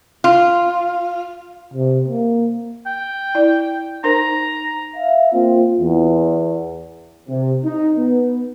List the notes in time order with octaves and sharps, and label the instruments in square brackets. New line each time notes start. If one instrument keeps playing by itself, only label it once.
[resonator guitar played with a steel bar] F4
[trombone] C3
A#3
[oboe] G5
[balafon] E4 D5
[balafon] D#4 A#4 C5 [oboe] A#5
[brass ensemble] E5 F5
A#3 C4 F4
E2
C3
D#4
B3